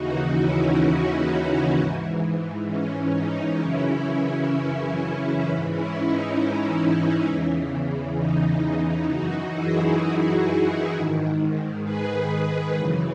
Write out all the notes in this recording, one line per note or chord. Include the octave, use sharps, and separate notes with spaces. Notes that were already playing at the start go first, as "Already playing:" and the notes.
Already playing: D#2 C#3 E3 D#4 F#4
C#4 E4
D#4
G#2 E3
C#4
D#4
F#2 C#3 E3 C#4 E4
G#2 E3 C#4 E4
C#4 E4
D#4
C#4
E2 C#3 E3
D#4
F#2 E3 D#4 F#4
E4 G#4
G#2 D#3
G#4 B4
F#2 C#3 E3